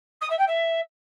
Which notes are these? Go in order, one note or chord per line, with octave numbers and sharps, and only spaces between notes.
D#6
E5
G5
E5